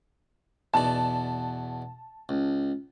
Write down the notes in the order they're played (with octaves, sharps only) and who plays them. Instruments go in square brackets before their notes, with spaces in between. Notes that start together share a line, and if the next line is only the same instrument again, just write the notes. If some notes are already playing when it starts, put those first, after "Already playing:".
[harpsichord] E2 B2 D5 [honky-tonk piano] A5
[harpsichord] C#2